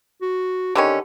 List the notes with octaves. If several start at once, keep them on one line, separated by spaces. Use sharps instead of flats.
F#4
D3 D#3 C#4 G4